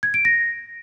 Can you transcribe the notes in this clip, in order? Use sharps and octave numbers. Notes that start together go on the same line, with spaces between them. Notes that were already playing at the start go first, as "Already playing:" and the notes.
G#6
D7
A#6